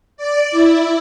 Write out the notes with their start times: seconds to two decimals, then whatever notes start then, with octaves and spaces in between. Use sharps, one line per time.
0.17 D5
0.51 E4